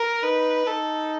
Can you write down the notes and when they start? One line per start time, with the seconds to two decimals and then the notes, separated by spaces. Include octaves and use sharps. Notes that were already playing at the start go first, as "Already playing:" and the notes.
Already playing: A#4
0.23 D#4 B4
0.67 D#4 A4